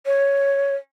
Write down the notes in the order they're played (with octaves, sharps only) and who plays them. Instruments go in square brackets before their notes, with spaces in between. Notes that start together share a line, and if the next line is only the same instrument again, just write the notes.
[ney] C#5